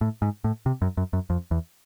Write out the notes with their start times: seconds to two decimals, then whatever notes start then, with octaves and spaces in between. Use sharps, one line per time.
0.01 A2
0.22 G#2
0.44 A2
0.66 C3
0.82 F#2
0.97 F#2
1.13 F#2
1.30 F2
1.51 E2